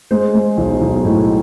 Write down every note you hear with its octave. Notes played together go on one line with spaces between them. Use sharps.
G#3 C5
G#3
B1
B1
A2